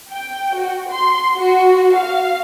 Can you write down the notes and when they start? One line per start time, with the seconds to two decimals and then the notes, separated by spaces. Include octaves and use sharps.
0.11 G5
0.56 F#4
0.91 C6
1.37 F#4
1.95 F5